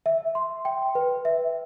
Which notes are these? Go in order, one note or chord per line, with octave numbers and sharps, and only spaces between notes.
E5
C6
G5
B4
E5